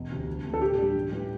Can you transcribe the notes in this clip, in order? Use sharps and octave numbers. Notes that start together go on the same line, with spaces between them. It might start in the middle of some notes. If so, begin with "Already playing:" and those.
Already playing: E1
D2 C3
D2
C3 A3
A4
A2 G4
G3 D4
A1
A2 E3 G3